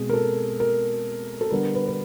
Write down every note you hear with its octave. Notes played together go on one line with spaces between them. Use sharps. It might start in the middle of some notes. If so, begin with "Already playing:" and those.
Already playing: B2 G#3 C4 G#4
A#4
A4
A#4
A4
D3 G3 B3 A#4
B4
B4